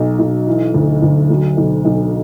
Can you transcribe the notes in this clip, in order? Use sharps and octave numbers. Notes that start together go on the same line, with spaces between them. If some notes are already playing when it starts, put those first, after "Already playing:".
Already playing: B1 F#3
B1
E3
D2
D2
F#3
B1
B1